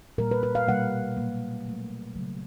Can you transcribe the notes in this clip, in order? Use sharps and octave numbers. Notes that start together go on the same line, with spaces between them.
A#2 G3 A#3 A#4
B4
B4
F5
B2 G3 A#3 F#5
A#2 F#3 A#3
A#2 F#3 A3
C#3 F#3 A3